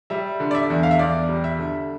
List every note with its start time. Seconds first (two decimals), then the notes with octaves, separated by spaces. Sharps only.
0.10 G3 E5
0.40 D3
0.51 D5
0.55 E5
0.70 E2
0.83 F5
0.91 E5
0.99 E2 D5
1.29 G3
1.44 E5
1.59 D3